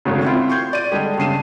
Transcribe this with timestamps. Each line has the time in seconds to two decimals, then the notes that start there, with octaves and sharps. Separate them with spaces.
0.05 G#1 D2 C#3
0.25 C4 E4 F4 F5
0.49 C6 C#6 G6 G#6
0.73 D5 D#7
0.92 D3 G3 G#3 G4
1.18 G2 C#3 C7 D#7 E7